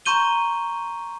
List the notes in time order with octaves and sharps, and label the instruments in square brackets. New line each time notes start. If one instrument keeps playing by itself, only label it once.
[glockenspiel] A#5 C6 C#6 G6 D#7 G7